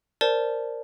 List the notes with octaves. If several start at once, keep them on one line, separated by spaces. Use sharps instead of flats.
A#4 C5 D5 A5